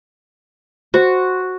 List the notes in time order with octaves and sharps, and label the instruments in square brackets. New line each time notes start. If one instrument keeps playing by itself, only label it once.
[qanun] F#4 [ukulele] C5